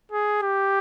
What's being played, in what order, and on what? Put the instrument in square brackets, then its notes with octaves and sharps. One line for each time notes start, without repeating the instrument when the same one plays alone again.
[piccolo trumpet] G#4
G4